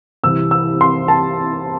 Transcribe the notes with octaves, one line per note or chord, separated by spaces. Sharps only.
C2 C3 E3 E6
E6
C6
A5